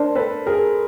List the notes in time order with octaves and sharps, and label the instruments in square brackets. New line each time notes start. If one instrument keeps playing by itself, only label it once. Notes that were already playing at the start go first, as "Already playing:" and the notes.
Already playing: [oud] D4 [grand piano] A#4 C5
[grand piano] A4 B4
G#4 A#4